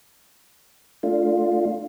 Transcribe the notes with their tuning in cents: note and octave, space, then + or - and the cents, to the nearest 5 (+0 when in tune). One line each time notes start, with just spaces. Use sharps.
A3 +0 D4 +0 F4 +0